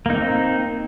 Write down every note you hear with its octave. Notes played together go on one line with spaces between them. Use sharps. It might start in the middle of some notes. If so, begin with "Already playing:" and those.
A#3 C4 D#4